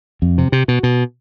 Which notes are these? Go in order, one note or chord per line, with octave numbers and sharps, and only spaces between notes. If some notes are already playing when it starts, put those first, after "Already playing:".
F2
C3
C3
B2
B2